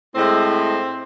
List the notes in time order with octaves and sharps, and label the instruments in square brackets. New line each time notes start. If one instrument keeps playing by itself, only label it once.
[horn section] A2 G#3 C4